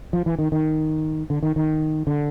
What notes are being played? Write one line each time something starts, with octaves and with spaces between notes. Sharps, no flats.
F3
E3
D#3
D#3
D3
D#3
D#3
D3